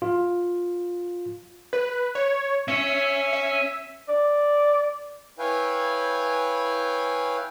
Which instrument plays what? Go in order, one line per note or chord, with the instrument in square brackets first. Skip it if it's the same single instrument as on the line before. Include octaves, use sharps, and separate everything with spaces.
[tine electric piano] F4
[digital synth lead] B4
C#5
[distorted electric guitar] C#4 C#5 [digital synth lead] E5
[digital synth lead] E5
[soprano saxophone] D5
[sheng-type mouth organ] E4 B4 C#5 F5 G5 G#5